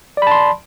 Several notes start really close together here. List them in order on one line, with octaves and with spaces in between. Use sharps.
D5 B5 A5 C6